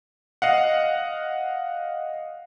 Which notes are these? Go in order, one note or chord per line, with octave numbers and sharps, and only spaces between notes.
D#5 F5 F#5